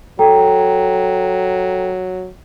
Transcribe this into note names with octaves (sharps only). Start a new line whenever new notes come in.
F#3 A4 G5 A#5